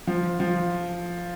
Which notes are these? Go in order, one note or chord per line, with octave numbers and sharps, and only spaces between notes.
F3
F3